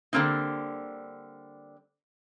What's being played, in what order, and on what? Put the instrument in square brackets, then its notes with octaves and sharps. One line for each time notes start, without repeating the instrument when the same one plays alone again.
[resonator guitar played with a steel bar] D3 G3 A#3 C4 D#4